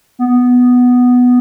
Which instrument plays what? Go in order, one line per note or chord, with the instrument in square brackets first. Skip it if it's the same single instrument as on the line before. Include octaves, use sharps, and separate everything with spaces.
[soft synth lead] B3